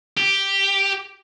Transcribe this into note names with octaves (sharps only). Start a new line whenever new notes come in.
G4